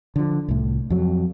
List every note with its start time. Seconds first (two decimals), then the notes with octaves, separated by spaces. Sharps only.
0.16 D3 F3
0.48 C2 A2
0.90 F2 F#3